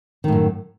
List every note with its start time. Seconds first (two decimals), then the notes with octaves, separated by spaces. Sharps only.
0.24 D#3
0.28 A2
0.32 F#2